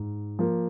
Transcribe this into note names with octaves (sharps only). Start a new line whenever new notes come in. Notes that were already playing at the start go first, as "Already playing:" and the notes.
Already playing: G#2
F3 A#3